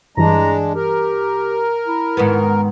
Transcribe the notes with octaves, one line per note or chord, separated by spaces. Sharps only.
G2 E3 G#3 D4 A#5
G4 A#4
E4
G#2 D#3 B3